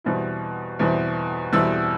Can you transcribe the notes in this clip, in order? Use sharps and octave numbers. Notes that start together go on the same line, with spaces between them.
E2 B2 G3 C4 E4
E2 B2 G3 C4 E4
E2 B2 G3 C4 E4 E6